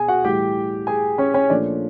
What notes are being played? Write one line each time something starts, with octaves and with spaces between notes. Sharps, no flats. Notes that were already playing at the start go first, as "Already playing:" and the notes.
Already playing: B2 G#4 G#5
F#4 F#5
A2 E3 G3 G4 G5
G#4 G#5
C#4 C#5
C#4 C#5
A#2 F3 A3 D4 D5